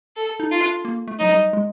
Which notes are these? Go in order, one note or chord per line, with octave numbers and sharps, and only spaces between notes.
A4
D#4
F4
D4
A#3
A3
F#3 D#4
G3
G#3